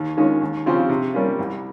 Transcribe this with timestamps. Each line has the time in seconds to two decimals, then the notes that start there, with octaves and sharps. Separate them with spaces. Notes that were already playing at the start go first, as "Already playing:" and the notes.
Already playing: D#2
0.17 D#3 G#3 C#4 F4
0.42 D#2
0.66 C#3 F3 C4 F4
0.89 C3
1.14 G3 A#3 C#4 F4
1.39 C2